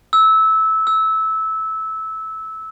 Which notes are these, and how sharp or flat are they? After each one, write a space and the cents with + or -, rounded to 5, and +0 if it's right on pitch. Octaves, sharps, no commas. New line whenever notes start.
E6 -20
E6 -20